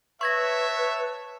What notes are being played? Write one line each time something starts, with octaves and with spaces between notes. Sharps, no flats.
B4 C#5 E5 A5 C#6 G#6 A#6